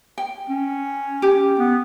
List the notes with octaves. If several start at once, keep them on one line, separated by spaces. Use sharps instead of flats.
G5
C#4
G4
B3